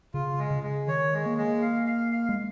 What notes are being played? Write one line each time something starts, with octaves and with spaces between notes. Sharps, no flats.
C#3 F4
G#3
C#3
G#3
D#3 C#5
G#3
A#3
G#3
F5
F5
F5
G#3